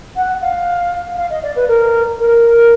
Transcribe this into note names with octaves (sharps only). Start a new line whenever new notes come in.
F#5
F5
F5
D#5
D5
B4
A#4
A#4